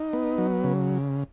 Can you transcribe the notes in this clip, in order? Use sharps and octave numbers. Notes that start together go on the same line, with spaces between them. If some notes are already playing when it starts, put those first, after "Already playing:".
Already playing: D#4
B3
F#3
C#3